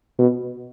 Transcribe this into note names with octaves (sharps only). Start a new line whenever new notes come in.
B2